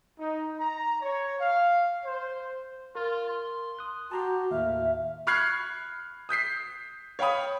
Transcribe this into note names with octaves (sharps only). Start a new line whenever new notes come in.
D#4
A#5
C#5
F5
C5
F4 A#4
C6
D#6 F#6
F#4 G4 A5 A#5 C6
D#2 A2 E5 F5
B5 C#6 F6 F#6 G#6 C7
D#6 G6 B6 C7
C#5 F5 G5 B5 D#6